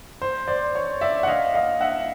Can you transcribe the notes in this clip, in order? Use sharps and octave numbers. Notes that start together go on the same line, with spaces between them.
C5
C5 D5
C#5
D5 E5
F#5
D#5 F5
D#5 F5
E5 F#5